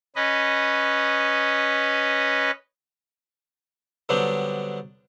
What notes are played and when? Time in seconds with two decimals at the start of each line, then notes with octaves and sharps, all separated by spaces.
0.16 C#4 B4 D#5
4.09 D3 F#3 G3 B3 C4 D4